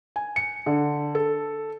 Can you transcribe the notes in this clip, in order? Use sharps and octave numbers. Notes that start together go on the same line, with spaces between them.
G#5
C#7
D3
A4